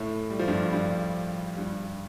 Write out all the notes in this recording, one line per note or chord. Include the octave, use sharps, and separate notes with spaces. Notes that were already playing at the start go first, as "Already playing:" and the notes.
Already playing: A2 A3
G3
F3
G2 G3
G2 G3
G2 G3